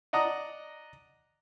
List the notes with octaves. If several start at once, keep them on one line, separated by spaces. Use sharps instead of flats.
D5 D#5 F#5 A#5 D#6